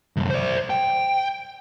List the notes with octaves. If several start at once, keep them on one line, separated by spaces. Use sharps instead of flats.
C2 F#2
C5 D5
G5